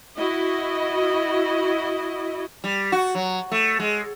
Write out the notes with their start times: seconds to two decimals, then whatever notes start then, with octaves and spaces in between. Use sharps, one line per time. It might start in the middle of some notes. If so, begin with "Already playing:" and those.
0.17 E4 F#4 D#5
2.64 G3
2.92 F#4
3.15 F#3
3.51 A3
3.80 G#3